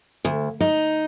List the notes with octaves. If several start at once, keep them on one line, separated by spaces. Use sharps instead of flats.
D2
D#4